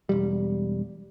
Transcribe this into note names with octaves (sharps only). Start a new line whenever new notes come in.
E1 G3